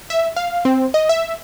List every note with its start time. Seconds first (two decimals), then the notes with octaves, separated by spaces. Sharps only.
0.10 E5
0.36 F5
0.65 C4
0.94 D#5
1.09 E5